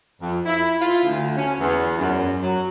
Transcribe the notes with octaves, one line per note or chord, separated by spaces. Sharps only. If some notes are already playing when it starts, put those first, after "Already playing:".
F2
E4
F4
D2
C#4
E2
F#2
F#3